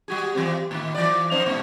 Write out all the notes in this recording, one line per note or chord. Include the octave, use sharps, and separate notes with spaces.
G3 F#4 G#4
E3 G3 C4
A2 D3 D#3
E3 D5
F2 D#4 C5
G2 A#2 G#3